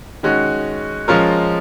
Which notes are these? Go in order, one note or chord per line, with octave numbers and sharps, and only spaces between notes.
D#3 G#3 C#4 F#4
F3 G#3 C#4 F4 A#4